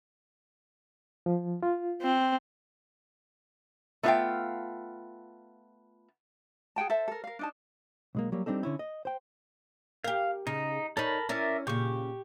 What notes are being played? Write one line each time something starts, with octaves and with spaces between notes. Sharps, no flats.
F3
F4
C4
A3 B3 F4 C#5 F5 G5
G#4 F#5 G5 A5
A4 C5 E5 A5
A4 A#4
A#4 F5
D4 D#4 A5
B1 G#3 A#3
F#3 G3 A#3
G3 C4 D4 D#4 A4
D3 C#4 E4
D#5
C5 G5
G4 A#4 F5
C#3 D#4
D#4 A4 A#4 C#5 B5
C#4 E4 A#4 D5 E5
A#2 C#3 G4 C#6